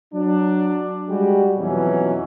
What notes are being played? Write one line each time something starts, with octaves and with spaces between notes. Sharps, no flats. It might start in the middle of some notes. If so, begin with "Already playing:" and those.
F#3 D4
G3 G#3 F#4 G4
F2 B2 E3 F#3 C#4